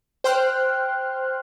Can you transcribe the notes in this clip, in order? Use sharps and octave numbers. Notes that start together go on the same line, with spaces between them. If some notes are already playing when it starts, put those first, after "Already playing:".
C5 G5 C6 F6 F#6